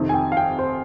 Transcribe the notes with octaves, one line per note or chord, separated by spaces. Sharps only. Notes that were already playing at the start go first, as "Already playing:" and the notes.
Already playing: F2 C3 D#3
G#5
G5
F5
G5
C5